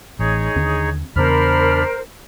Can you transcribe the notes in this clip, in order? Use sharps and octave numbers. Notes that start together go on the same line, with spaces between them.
A1 D#4 G#4 C#5
D#2 D3 C4
E2 C#3 B3 D4 A#4 C5 B5 F6